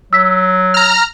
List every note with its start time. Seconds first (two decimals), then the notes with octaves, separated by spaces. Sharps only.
0.13 F#3 E6 B6
0.74 A#5 F6